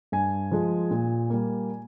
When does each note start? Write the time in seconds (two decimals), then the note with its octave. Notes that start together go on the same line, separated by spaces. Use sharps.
0.12 G2 G#5
0.51 F3 G#3
0.91 A#2
1.30 G3 A#3